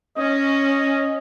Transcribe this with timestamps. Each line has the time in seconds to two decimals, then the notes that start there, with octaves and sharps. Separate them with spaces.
0.18 C#4 D#5